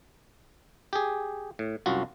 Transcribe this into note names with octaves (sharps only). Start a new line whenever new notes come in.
G4 G#4
A2
C2 F#2 F4 F#4